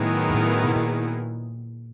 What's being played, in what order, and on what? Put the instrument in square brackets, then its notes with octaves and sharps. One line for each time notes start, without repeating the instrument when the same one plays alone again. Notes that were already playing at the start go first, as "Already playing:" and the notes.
Already playing: [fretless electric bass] A2 [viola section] D#3 F#3 B3 E4 G#4
[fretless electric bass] G#2
A2
B2
A#2